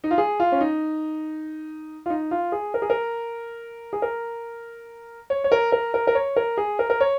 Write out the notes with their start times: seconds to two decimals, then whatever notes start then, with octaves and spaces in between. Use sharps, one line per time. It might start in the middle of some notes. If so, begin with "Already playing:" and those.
0.04 D#4
0.11 F4
0.18 G#4
0.40 F4
0.52 C#4
0.61 D#4
2.06 F4
2.10 D#4
2.31 F4
2.52 G#4
2.74 A#4
2.82 G#4
2.90 A#4
3.93 G#4
4.02 A#4
5.30 C#5
5.44 C#5
5.52 A#4
5.72 A#4
5.94 A#4
6.07 A#4
6.15 C#5
6.36 A#4
6.57 G#4
6.79 A#4
6.90 A#4
7.00 C#5